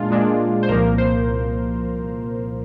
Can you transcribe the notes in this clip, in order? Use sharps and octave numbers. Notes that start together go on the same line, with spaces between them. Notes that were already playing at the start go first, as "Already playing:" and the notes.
Already playing: A#2 G#3 D4 F4
A#2 G#3 D4
C5
C2 A#2 F3 A#3 A#4
C5